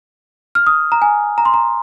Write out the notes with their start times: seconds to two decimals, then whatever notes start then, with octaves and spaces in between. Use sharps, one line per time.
0.55 F6
0.67 D#6
0.92 A#5
1.02 G#5
1.38 A#5
1.45 C6
1.54 A#5